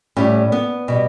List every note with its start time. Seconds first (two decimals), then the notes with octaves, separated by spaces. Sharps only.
0.17 A2 G3 C#4
0.52 B3
0.88 B2 G3